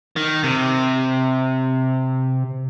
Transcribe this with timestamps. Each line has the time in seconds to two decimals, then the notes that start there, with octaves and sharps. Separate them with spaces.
0.16 D#3
0.44 C3